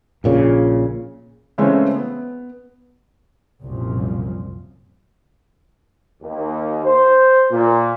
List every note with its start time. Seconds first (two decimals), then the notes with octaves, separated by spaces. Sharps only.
0.24 A#1 A#2 C#3
1.58 C#3 E3 G#3 A3 C4 C#4
1.94 B3
3.62 C2 F#2 A#2 F3
6.22 D#2
6.84 C5
7.51 A#2